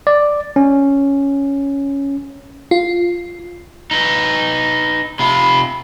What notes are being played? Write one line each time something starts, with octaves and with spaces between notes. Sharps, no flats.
D5
C#4
F4
D#4 B4
C3 F4 B5